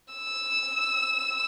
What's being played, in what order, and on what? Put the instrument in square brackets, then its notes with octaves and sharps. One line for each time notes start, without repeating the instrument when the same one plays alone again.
[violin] E6